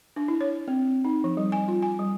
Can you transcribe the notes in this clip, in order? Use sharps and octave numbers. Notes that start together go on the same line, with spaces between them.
D4
E4
C#5
C4
D#4
F3
G3
G#5
F4
G#5
G3